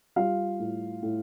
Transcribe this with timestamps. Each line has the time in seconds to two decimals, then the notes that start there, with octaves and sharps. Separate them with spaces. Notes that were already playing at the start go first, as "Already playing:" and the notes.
0.16 G3 F4 F5
0.59 A2
1.02 A2